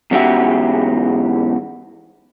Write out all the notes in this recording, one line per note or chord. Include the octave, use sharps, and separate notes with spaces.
E2 G#2 C#4 F#4 G4 E5